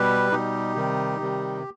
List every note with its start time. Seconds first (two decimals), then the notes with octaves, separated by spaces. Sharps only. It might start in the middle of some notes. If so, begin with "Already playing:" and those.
Already playing: B2 G3 G4 B4
0.32 B2 G3 D#4 G4
0.76 C3 D#3 G3
1.20 C3 D#3 G3